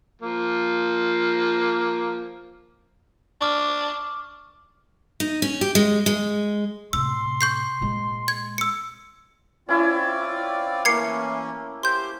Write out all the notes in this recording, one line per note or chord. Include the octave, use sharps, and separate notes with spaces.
F3 A#3
D4 C#6 D6 F6
D#4
C#4
G4
G#3
G#3
A2 C3 C6 E6
C#6 G6 C7
A#2 G#3
G#6
E6 C#7
C4 C#4 E4 F4 D5 E5
E3 A3 A#3 C#4 G#6 C7 C#7
G4 C5 C6 G6